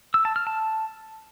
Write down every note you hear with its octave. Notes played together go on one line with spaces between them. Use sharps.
E6
A5
F6
A5